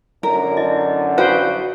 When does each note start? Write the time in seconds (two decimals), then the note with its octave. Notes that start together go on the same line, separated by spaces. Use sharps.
0.23 F#2 D3 A#4
0.57 E4 D#5
1.18 F#4 A4 B4 C5 F5 G5